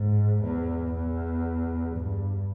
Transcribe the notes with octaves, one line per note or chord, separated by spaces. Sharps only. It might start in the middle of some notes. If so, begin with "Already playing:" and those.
Already playing: G#2
E2
E2
G2